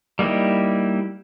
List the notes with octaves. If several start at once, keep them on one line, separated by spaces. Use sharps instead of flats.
G3 A#3 D#4 E4 G4